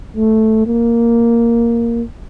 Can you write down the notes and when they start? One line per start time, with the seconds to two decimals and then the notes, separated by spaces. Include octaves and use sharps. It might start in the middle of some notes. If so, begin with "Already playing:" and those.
0.16 A3
0.66 A#3